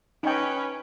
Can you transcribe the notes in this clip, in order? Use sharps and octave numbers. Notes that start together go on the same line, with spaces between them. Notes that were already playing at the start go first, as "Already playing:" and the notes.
C#4 D#4 B4 D#5 G5